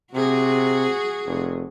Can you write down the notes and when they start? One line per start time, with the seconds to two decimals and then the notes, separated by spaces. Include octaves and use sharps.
0.14 C3 F#4 G#4
1.26 F1